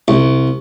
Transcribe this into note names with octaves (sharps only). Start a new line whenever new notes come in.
C2